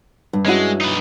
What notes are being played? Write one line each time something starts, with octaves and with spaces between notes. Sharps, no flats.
G2
G#3 C#4 E4 F#4
D#4 B4